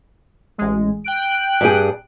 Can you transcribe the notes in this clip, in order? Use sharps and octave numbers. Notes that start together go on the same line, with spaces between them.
A1 G#3
G5 F#6 D7
G2 G3 G#4